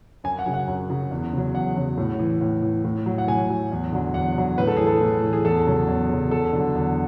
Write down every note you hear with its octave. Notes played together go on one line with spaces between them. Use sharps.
F#2 G#5
F#5
C#3 F#3
F#5
F#2
C#3 F#3
E2
C#3 F#3
E2 F#5
C#3 F#3
A2
E3
A2
E3
A2
F#3
F#5
A2 G#5
F#3
E2
D3 F#3
E2 F#5
D3 F#3
A2 B4
A4
E3 G#4
A4
A2
E3
G#4
E2 A4
C#3 F#3
E2
C#3 F#3
E2 A4
D3 F#3
E2